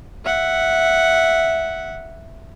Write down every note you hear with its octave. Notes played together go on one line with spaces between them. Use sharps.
E5 F#5